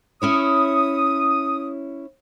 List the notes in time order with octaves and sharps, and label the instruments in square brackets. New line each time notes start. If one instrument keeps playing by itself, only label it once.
[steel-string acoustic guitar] C#4 E4 C#5 [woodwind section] D#6